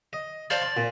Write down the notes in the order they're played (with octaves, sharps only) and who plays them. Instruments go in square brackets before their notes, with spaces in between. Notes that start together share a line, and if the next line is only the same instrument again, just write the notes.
[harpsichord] D#5
[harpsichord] C5 F5 A5 [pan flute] D5
[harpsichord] C6
A#2